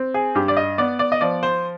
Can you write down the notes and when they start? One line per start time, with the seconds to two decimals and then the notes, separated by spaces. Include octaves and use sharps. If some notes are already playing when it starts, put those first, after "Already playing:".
Already playing: C4
0.14 G#4
0.35 G2 G4
0.48 D5
0.57 D#5
0.78 B3 D5
0.99 D5
1.12 D#5
1.21 F3 D5
1.43 C5